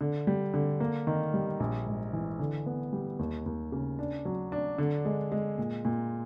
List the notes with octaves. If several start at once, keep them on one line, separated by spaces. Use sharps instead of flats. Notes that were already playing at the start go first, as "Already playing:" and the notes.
D3
G3
D3
A#3
D#3
G3
A#1
G#2
E3
D3
B3
G3
D#2
D#2
C#3
D4
F#3
D4
D3
G#3
G#3
A#2
A#2